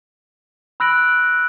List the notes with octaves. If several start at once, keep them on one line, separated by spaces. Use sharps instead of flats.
B5 E6 F#6 A#6 D7 F#7